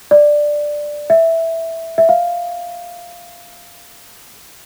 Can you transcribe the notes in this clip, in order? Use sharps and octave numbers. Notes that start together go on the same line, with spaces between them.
D5
E5
E5
F5